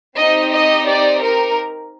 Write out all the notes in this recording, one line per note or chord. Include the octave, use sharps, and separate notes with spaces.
C4 D#4 G4 D#5
D#5
D5
A#4